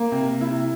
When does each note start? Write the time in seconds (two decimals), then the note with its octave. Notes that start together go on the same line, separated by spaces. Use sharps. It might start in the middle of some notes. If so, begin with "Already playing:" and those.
Already playing: A#3
0.12 C3
0.41 E4